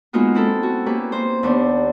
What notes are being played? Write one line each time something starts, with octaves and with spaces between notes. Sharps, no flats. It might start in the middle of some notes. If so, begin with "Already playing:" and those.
G#3 A#3 B3 D#4 F4 F#4
C4 E4 A4
F#4
A#3 C#4 G4 B4
A#3 C5
D#2 B3 D4